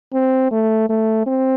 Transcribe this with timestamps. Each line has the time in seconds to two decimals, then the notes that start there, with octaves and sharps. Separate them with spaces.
0.13 C4
0.51 A3
0.89 A3
1.27 C4